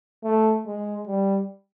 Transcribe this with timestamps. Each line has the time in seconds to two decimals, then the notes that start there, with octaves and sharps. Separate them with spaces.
0.24 A3
0.66 G#3
1.07 G3